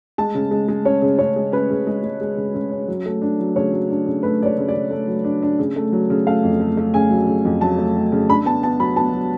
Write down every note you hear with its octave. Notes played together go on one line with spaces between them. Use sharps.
G#3 A5
C#3
G#3
G#3
C#4 C#5
C#3
C#3 C#5
G#3
C#4 B4
C#3
G#3
G#3
G#3
C#3
C#3
C#4
F#3
A3
D4
F#3
C#3 C#5
F#3
D4
C#3
A3 B4
C#3 D5
C#5
C#3
D5
C#3
A3
F#3
D4
D4
C#3
A3
F#3
C#3
A3 F5
F2
A3
A3
C#3 G#5
F#3
C#3
F2
F#3 A5
A3
F#3
C#3
D4 B5
B3 A5
B3 A5
F#3 B5
B3 A5
F#3